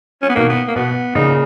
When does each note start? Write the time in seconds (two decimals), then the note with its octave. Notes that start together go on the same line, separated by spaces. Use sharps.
0.22 C#4
0.29 B3
0.35 B2 D#3 A#3
0.50 B3
0.68 A#3
0.76 B2 B3
1.15 A#2 C#3 D#4